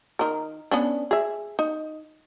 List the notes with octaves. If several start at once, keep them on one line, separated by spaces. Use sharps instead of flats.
D#3 A#4
B3 C#4 D4
G#4 E5
D#4